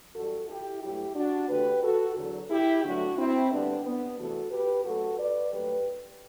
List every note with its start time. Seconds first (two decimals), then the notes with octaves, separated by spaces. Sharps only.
0.15 F#2 E3 G3 F#4 A4
0.48 E4 G4
0.82 G2 F#3 A3 E4 G4
1.15 D4 F#4
1.49 E2 D3 A3 G4 B4
1.83 F#4 A4
2.16 E2 D3 F#3
2.50 E4 G4
2.83 G2 D3 F#3 A3 D4 F#4
3.17 C4 E4
3.50 D2 D3 G3 B3 D4
3.84 B3
4.18 E2 C3 E3 A3 F#4 A4
4.51 G4 B4
4.85 F#2 F#3 A3 F#4 A4
5.19 B4 D5
5.52 G2 F#3 A3 G4 B4